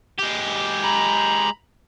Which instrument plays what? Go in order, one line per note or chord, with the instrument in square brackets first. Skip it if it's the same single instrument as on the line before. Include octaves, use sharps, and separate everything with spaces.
[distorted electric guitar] G#3 G4
[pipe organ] A#5 B5